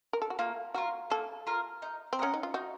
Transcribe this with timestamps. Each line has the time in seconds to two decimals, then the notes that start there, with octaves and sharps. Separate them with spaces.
0.13 A#4
0.22 A4
0.30 F#4
0.39 A#3 F4
0.74 F4 F#4 A#4
1.10 A#3 A4
1.47 F4 A#4
1.82 D#4
2.13 C4
2.19 C#4 A#4 D#5 F#5
2.34 D#4
2.43 F4
2.54 D#4 F#4